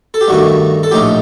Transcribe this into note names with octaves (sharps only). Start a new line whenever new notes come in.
A4
G4
G2 D#3 A3 F#4
A4
A#1 A2 A3 D#4 G4